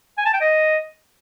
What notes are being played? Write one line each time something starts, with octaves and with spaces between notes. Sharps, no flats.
G#5
A5
G5
D#5